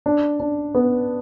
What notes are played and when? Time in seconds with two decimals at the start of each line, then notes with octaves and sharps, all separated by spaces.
0.06 D4
0.40 D4
0.75 B3